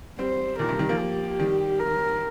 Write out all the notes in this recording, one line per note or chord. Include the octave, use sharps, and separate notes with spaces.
G3 C4 C5
A#2 D#3 A#4
G2 C3
D#3 G3
F3 A#3
G4
D#3 G3
A#4